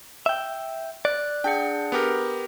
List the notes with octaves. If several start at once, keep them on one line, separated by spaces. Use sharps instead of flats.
E5 G5
D5 F#6
D4 G#4 F#5 G5
B3 G4 A#4